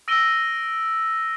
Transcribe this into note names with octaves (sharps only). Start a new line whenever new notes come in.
E6 A#6 D7 D#7 G7